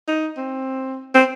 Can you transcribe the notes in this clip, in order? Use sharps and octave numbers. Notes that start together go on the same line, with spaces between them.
D#4
C4
C4